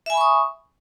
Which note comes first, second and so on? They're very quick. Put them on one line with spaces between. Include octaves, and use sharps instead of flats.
E5 G#5 B5 C#6 D#6